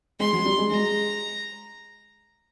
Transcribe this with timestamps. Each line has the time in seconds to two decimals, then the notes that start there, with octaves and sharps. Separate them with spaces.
0.20 G#3 C6
0.33 F#3
0.45 G3
0.58 G#3
0.70 G#3 A#5